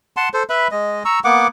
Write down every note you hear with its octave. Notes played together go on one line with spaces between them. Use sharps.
F#5 A5 C6
A4 C5
B4 E5 B5
G#3 D#5
A#5 C#6 E6
A#3 B3 F#5 D6